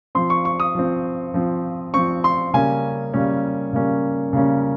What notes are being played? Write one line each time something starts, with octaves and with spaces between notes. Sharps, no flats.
F3 C4 C6
C#6
C#6
D#6
F3 C4
F3 C4
F3 C4 C#6
C6
C#3 G3 A#3 C#4 G#5
C#3 G3 A#3 C#4
C#3 G3 A#3 C#4
C#3 G3 A#3 C#4